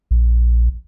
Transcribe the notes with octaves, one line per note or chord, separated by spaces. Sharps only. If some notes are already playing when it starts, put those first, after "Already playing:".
A#1